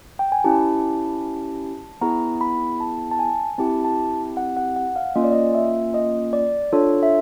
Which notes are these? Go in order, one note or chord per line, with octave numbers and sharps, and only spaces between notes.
G5
G#5
C#4 E4 G4 A5
B3 E4 G#4 A#5
B5
A5
A5
G#5
C4 E4 G4 A5
A5
F#5
F#5
F#5
F5
A#3 C#4 F4 D#5
D5
D#5
E5
D#5
D5
D4 F4 A4 C#5
E5